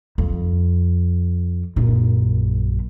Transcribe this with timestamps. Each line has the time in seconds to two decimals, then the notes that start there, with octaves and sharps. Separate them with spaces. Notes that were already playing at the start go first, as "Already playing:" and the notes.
0.18 F2
1.76 A#1 F#2